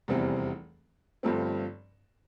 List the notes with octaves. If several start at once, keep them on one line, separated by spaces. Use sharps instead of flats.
F1 E2 E3 G3 C4
G1 G2 F3 A3 C4